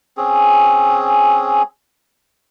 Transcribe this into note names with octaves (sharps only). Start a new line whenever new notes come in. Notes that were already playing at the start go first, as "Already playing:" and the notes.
C4 C#4 G#4